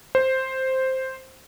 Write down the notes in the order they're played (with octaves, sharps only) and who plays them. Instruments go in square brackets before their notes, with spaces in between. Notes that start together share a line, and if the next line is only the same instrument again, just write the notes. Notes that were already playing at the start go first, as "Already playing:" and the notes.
[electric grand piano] C5